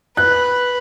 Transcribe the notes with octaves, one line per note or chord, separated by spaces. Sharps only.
B4 F#6